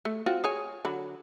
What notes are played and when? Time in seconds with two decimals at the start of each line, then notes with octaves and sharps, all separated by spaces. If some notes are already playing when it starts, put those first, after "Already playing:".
0.05 A3
0.26 C4 F4 F#4
0.44 G#4 C#5 G#5
0.85 D3 F#3 B5